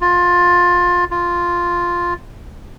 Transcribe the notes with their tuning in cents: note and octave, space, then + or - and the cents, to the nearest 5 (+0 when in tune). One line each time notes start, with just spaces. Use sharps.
F4 +20
F4 +0